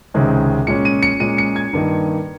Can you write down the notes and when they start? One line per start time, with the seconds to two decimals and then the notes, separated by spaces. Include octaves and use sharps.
0.14 C#2 C3 D#3 G#3 C#4
0.67 A#2 G#3 C#4 C#7
0.85 D#7
1.03 C#7
1.20 A#2 G#3 C#4 D#7
1.38 C#7
1.56 G#6
1.73 G2 D#3 A#3 D#4